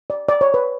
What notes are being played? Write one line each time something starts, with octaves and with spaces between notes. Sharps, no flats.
D5
D5
C#5
B4